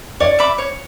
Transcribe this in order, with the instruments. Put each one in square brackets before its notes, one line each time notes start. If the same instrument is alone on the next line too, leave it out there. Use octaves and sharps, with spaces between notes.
[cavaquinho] C#5 [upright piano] D5
[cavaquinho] E5 B5 D6
C#5